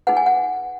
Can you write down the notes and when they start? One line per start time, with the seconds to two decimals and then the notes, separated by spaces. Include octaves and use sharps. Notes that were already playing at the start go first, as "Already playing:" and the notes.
0.07 D#4 G#4 B4 F#5
0.17 G#5
0.26 F#5